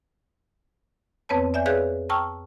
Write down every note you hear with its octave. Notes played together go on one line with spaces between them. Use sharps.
F2 B3 C4 B4 C#5 A5
D5 E5 G#5 G6
G#4 B4 C#5 F5 F#6 G6
G5 A5 A#5 C#6 E6 F6